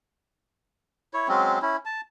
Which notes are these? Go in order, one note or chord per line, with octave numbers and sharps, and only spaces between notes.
E4 C#5
F#3 G#3 C4 C#4
C#4 E4
A5